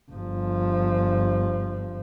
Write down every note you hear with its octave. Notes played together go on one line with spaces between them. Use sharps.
G1 F3